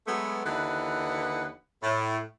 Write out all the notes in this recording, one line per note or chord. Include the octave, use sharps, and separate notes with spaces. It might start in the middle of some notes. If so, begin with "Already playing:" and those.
F#3 G#3 A3 B3
D#2 D3 E3 B4 D#5 F#5
A2